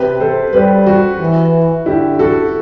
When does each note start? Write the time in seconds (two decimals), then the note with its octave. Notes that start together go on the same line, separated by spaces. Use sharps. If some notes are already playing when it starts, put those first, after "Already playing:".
Already playing: C3 G4 B4
0.20 A4 C5
0.53 G3 G4 B4
0.86 F#4
1.20 E3
1.86 D3 E4 G4
2.19 F#4 A4